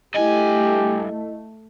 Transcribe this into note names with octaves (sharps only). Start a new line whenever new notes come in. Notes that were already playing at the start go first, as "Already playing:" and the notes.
G2 A3 E4 G4 D#5 G#5